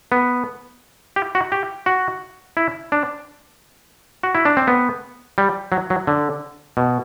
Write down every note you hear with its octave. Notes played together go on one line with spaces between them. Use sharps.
B3
G4
F#4
G4
F#4
E4
D4
F#4
E4
D4
C4
B3
G3
F#3
F#3
D3
B2